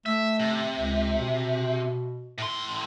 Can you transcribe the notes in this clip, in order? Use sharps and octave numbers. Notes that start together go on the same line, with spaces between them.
A3 E5
C3
C#2
B2
A2 C6